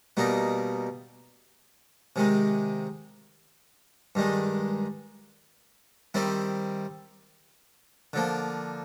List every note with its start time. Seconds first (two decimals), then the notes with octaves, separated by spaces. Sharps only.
0.17 B2 G3 A#3 D#4
2.16 C3 D#3 G#3
4.15 G2 D#3 G#3
6.14 D#3 G3 C4 E4
8.13 D3 F3 A#3